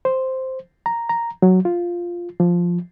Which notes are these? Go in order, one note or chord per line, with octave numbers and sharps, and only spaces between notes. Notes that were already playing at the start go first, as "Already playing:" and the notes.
C5
A#5
A#5
F#3
F4
F3